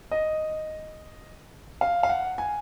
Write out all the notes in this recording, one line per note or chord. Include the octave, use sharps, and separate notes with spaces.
D#5
F5
F5
F#5
G#5